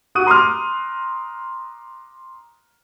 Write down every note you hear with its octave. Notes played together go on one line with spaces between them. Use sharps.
F#4 C#6 D#6 F#6 D#7
A#5 C6 D6 D#6 F6